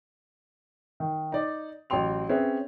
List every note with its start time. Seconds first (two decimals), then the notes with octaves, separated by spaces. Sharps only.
1.00 D#3
1.32 D#4 D5
1.90 A1 F#3 G5 C6 F7
2.29 C4 C#4 G#4 B4 E5